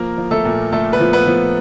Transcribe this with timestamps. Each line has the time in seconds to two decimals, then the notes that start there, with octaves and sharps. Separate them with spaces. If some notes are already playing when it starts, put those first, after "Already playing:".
Already playing: F3 A#3 A#4
0.17 F3
0.31 A3 A4
0.45 A#2
0.72 A#2 A3 A4
0.93 B3 B4
1.00 F3
1.13 B3 B4
1.27 F3